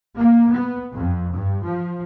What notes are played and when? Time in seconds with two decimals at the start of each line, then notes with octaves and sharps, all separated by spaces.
0.17 A#3
0.50 B3
0.95 F2
1.35 G2
1.64 F3